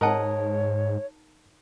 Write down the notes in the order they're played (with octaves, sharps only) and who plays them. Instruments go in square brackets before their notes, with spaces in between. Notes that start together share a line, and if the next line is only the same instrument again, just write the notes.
[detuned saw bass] G#2 [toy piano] D#4 A5 D#6 [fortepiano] A#4 D#5 F#5 [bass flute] C#5